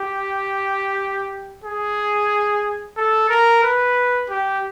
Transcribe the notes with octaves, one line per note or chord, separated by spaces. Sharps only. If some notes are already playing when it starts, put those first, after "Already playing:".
Already playing: G4
G#4
A4
A#4
B4
G4